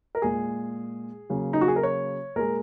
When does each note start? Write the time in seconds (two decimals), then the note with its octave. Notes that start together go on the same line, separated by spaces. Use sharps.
0.15 A#4
0.22 A#2 G#3 G#4
1.30 C#3 F#3 A#3
1.53 D#4
1.61 F#4
1.68 G#4
1.76 A#4
1.83 C#5
2.36 A#2 G#3 A#4